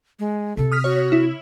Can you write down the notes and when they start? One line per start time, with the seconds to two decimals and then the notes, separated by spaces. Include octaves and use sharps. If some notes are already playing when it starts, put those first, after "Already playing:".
0.19 G#3
0.57 C3 C4 A4
0.72 D#6 F6 B6
0.84 F#4 C#5
1.12 E4